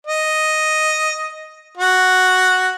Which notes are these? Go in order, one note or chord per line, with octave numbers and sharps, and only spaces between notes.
D#5
F#4